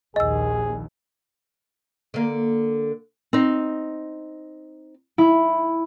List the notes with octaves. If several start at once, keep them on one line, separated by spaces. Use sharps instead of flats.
A#1 D#2 G#4 D#5 E6
D3 A#3
C4 D#4
E4